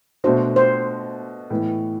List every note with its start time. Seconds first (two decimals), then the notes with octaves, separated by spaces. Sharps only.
0.24 B2 A3 D4 F#4 C5
0.56 C5
1.50 A2 E3 B3